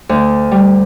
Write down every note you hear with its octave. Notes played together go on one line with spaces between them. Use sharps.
D2
G3